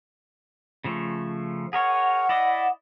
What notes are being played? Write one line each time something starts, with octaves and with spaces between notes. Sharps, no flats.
C#3 F3 A3
G#4 A#4 C#5 F#5
E4 D5 D#5